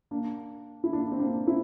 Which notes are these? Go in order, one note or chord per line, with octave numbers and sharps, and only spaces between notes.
A#3 D4
E4
A#3 D4
C4
A#3 D4
C4 E4